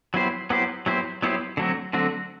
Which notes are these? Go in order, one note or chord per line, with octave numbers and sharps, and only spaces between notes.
F#3 B3 E4 G4 C5
F#3 B3 E4 G4 C5
F#3 B3 E4 G4 C5
F#3 B3 E4 G4 C5
D3 F#3 A3 C4 F#4
D3 F#3 A3 C4 F#4